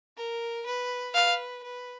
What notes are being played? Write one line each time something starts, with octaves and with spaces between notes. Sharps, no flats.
A#4
B4
B4 F5
B4